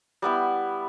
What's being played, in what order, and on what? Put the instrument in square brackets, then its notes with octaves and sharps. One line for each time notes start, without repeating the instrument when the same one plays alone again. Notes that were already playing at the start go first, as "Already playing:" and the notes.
[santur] G3 B3 E4